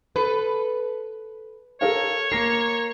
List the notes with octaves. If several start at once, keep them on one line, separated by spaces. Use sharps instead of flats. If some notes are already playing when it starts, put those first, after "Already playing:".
A4 B4
A4 A#4 C#5 F5
A#3 A#4 A#6 C7